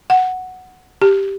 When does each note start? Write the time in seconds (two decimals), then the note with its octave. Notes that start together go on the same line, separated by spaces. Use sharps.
0.10 F#5
1.02 G4